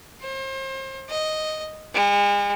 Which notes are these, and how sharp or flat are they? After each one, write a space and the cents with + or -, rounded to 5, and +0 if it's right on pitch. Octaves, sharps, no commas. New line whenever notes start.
C5 +35
D#5 +0
G#3 -40